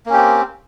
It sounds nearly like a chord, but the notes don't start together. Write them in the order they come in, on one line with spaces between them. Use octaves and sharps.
A#3 C#4 G4 C4